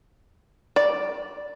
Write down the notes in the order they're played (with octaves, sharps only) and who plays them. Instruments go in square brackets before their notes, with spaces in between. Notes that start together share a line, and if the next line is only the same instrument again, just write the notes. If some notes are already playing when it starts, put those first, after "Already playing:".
[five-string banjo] D5